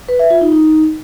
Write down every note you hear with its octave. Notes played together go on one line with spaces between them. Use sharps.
B4
E5
F4
D#4
D#4